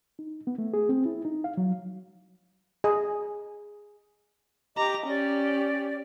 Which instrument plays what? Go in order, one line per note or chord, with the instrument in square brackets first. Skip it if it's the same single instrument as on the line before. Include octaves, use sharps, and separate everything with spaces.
[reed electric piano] D#4
B3
A3
G#4
C4
E4
D#4
F5
F#3
[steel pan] G#4 D#5
[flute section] G4 D#5 D6 [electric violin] A#5
[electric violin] C#4 [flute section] G4 D5